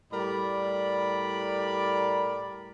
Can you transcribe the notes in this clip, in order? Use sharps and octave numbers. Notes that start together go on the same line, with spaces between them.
A2 G3 A#4 D5 B5